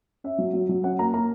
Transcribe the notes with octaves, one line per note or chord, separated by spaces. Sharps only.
C#4 E5
F#3
F#3
F#3
C#4 F#5
A#3 A#5
A#3 A#5